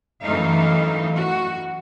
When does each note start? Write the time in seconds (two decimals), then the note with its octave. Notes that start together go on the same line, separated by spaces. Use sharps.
0.22 F#2 E3 A3 D#4 F5
1.16 F#4